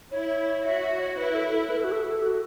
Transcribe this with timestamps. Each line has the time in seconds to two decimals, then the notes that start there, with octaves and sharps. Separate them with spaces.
0.11 E4 C#5
0.64 F#4 E5
0.82 E5
1.00 C#5
1.17 E4 B4
1.35 A4
1.53 A4
1.70 B4
1.77 A4
1.84 F#4
1.92 A4
2.22 F#4